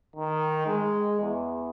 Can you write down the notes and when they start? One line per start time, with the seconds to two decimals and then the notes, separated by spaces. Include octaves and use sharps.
0.16 D#3
0.66 G#3
1.21 E2